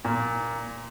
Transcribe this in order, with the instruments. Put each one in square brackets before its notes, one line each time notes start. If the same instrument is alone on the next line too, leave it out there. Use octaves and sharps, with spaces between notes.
[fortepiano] A#2